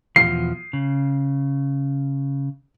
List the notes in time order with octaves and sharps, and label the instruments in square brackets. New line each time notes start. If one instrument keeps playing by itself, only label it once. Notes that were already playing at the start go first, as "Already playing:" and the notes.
[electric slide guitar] E2 B2 F3 [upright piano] C7
[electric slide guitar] C#3